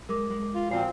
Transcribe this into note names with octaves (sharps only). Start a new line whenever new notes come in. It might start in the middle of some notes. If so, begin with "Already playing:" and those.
G#3 A#4 D6
G#3
F4
A#2 F3 C4 F#4 C7